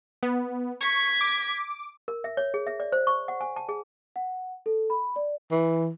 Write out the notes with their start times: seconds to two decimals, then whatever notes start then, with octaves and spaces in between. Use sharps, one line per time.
0.23 B3
0.81 C#6 G#6 B6
1.21 D6
2.08 A#4
2.24 E5
2.37 C#5
2.54 G#4
2.67 E5
2.80 D5
2.92 C5
3.07 C#6
3.28 F#5
3.41 G#5
3.56 A5
3.69 G#4
4.16 F#5
4.66 A4
4.90 B5
5.16 D5
5.52 E3